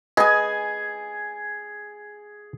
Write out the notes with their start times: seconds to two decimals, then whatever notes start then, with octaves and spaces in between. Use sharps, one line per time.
0.17 G#4 B4 D#5 G#5